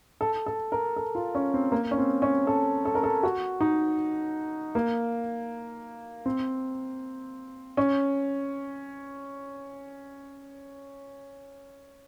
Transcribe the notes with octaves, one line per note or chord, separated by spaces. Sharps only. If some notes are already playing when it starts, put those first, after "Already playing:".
A4
A4
A#4
A4
F4
C#4
C4
A#3
C#4
C4
C#4
A4
A4
A#4
A4
F#4
D#4
A#3
C4
C#4